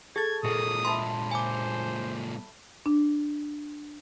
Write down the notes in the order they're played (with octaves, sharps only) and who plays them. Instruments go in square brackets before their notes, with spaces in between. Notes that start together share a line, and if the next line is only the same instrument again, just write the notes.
[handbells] G#4 A6 [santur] A4 [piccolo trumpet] G#6
[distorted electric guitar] A#2 G#3 [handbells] G#4 [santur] A#4 D6 [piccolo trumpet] D#6
[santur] E5 A5 B5 [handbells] C6
[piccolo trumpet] C5 [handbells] G#5 D6
[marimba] D4